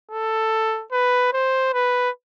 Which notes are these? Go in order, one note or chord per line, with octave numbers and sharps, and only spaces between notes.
A4
B4
C5
B4